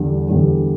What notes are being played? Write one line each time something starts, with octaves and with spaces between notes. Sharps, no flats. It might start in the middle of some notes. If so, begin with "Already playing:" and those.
Already playing: E2 D3 G3
E2 D3 G3